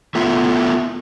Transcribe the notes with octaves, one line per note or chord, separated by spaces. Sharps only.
A3 B3 E4 F4 E5